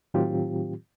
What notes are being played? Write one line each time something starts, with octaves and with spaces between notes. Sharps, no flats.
A2 D#3 F#3 C4 F4 G4